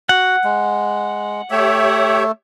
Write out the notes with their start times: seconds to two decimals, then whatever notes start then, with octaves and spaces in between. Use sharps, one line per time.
0.09 F#4 F#5
0.44 G#3
1.51 A3 G4 C#5 E5